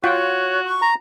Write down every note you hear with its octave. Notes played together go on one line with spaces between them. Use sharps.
F4 F#4 C#5 F#5 G5
C#6
A#5